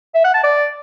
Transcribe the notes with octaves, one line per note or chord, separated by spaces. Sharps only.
E5
F#5
A5
D5